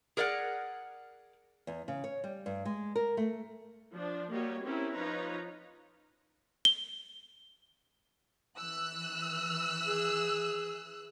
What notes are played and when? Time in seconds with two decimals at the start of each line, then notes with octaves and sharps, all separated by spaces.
0.17 G#4 A#4 D5 F5 F#5
1.67 E2
1.88 C#3
2.04 C#5
2.24 G3
2.46 G2
2.65 G#3
2.96 A#4
3.17 A3
3.91 F3 D4
4.32 G3 A#3 F#4 G4 C#5 D#5
4.64 C4 C#4 E4 G4 A#4
4.94 F3 D#4 F4 B4 C#5 A#5
6.65 G7
8.58 E3 E6 F#6
9.86 G#4